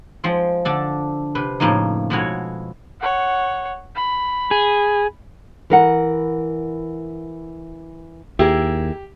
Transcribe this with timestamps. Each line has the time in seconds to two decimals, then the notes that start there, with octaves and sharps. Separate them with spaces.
0.24 F3 G#3 C4
0.65 D3 D4 A4
1.35 C3 B4
1.60 F2 A2 C#3 A#3 D#4
2.10 F2 B2 G#3 E4 F#4 C#5
3.00 C#5 F#5
3.95 B5
4.51 G#4
5.70 E3 A#4 F#5
8.39 D#2 E4 G4 G#4 A#4